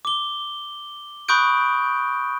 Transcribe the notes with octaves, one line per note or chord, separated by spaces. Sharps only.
D6 G7
B5 C#6 D#6 F#6 G6 D7